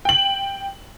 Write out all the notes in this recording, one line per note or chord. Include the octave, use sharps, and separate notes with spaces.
G5 F#7